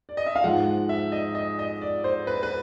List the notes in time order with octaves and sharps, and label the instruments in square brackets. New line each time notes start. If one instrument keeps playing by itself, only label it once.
[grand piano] D5
D#5
E5
F5
G#2 F3 G#3 F#5
E5
D#5
D#5
D#5
D5
C5
B4
B4